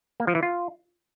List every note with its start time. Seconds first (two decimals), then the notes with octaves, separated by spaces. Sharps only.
0.20 A#3
0.27 F3
0.35 E3
0.43 F4